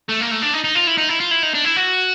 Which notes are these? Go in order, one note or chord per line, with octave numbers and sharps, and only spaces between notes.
A3
A#3
A3
D4
D#4
D#4
F4
E4
D#4
E4
F4
E4
D#4
D4
E4
F#4